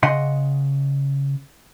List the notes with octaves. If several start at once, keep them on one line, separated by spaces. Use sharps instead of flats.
C#3 D#5 F#5 C6